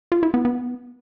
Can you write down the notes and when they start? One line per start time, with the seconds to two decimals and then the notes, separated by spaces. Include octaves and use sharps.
0.12 F4
0.23 E4
0.34 B3
0.45 B3